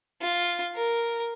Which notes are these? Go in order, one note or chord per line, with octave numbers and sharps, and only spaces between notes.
F4
A#4